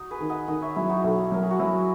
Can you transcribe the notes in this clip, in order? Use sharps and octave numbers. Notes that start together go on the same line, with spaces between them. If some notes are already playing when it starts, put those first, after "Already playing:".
Already playing: D#4 F#4 D#5
G#4 B4
D#3
D#5 F#5
D#3 D#5 F#5
C#5 E5
F#3 E4 G#4
D#4 F#4
B1 E4
F#3 A#4
G#4
F#4
F#3 E4